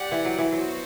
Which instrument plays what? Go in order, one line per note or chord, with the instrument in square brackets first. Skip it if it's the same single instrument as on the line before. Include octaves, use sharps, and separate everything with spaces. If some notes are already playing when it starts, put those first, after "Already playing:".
Already playing: [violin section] G4 D5 F#5
[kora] E3
F#3
E3
[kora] F#3 [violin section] B3 F#4 C5